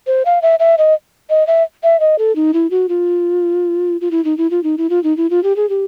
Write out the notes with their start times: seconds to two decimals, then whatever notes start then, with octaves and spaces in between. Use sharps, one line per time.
0.07 C5
0.25 F5
0.42 E5
0.59 E5
0.78 D#5
1.30 D#5
1.47 E5
1.83 E5
2.00 D#5
2.19 A4
2.36 D#4
2.54 E4
2.71 F#4
2.89 F4
4.01 F4
4.11 E4
4.25 D#4
4.38 E4
4.51 F4
4.64 D#4
4.78 E4
4.90 F4
5.04 D#4
5.17 E4
5.30 F4
5.44 G4
5.56 G#4
5.69 G4